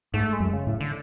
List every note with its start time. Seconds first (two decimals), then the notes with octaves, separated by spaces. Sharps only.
0.14 G#2 A3
0.33 G#3
0.40 F#2
0.53 C#3
0.67 A2
0.80 D3